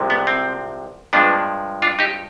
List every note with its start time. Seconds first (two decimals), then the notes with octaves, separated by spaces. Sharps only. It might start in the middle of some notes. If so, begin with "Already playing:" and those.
Already playing: C2 C3 F3 G#3
0.10 B3
0.27 C4
1.13 G2 F3 G#3 B3 D4
1.82 D4 F4
1.99 D#4 G4